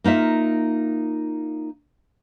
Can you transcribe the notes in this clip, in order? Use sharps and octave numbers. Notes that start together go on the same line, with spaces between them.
A#3 D#4 F4 E5